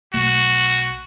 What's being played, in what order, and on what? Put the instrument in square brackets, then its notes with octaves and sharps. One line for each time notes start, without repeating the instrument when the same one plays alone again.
[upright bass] B1 A3 [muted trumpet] F#4